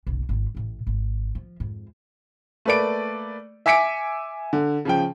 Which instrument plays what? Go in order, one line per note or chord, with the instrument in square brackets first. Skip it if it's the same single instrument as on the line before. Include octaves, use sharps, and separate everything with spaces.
[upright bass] F#1 B1
G#1 F4
A1 A2
G#1
F3
F2 G#2
[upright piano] A3 A#3 B4 D5 D7
E5 G#5 D6 B6 C#7 D7
D3
C#3 F3 G5